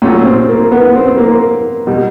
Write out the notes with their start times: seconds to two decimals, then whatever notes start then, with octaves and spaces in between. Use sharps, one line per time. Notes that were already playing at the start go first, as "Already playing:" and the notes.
0.02 A#2 F#3 A3 C#4
0.25 C4
0.49 A#3
0.72 B3
0.90 B3
0.95 C4
1.06 C4
1.17 A#3
1.87 B2 G3